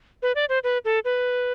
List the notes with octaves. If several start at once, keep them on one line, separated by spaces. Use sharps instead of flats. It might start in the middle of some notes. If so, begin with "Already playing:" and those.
B4
D5
C5
B4
A4
B4